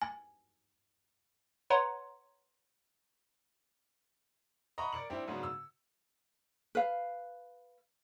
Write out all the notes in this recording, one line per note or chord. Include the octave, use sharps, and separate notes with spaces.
G#5
B4 C#5 F#5 A#5 C6
D#5 F#5 A#5 B5 C#6
A#4 D5 C#7 F#7
G3 C4 D4 E4 G4
G#2 C#3 F#3 B3 D4
E6
B4 F5